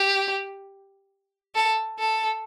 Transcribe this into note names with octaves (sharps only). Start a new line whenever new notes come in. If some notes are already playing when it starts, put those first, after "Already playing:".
Already playing: G4
A4
A4